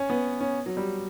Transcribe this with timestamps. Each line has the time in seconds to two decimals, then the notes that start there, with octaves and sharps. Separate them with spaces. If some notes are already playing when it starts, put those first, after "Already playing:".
Already playing: C#4
0.10 B3
0.40 C#4
0.66 F#3
0.77 G3